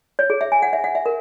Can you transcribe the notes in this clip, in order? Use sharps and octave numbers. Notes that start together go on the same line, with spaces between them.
C#5
G#4
E5
G#5
F#5
E5
F#5
E5
A#4